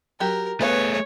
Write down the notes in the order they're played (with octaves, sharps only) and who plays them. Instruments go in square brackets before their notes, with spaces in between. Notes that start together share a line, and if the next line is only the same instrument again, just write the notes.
[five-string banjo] F#3 G4 [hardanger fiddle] A#4
[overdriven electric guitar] A3 G#4 [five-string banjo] B3 B4 F5 [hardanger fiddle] C#5